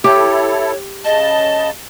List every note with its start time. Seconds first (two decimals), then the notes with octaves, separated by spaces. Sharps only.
0.04 E4 G4 A4 C#5
1.05 C#3 D#5 A5